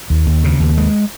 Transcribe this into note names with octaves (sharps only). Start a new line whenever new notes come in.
D#2
D#2
C#3
D#2
G#3